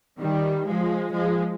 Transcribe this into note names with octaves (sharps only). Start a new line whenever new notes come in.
D#3 G3
F3 G#3
F3 G#3